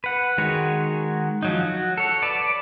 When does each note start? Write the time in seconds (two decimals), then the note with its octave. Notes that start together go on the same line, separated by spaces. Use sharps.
0.04 B4 F#5
0.38 D#3 G#3 F#4 C#5
1.43 F3 F#3 D#4
1.64 F#4
1.98 A4 C#5
2.22 B4 D5 A5